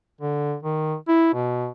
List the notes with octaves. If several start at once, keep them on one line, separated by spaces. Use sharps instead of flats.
D3
D#3
E4
B2